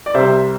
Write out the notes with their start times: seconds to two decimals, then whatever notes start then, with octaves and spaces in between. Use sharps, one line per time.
0.06 D5
0.14 C2 C3 G3 C5 E5